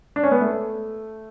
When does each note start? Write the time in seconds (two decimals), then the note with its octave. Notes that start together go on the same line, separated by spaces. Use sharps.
0.16 D4
0.23 C#4
0.31 B3
0.41 A3